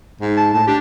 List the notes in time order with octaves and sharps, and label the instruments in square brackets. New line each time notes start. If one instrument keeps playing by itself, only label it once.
[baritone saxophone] G#2
[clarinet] A5
[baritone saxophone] A2 [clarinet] A5
[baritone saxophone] D4 [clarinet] G4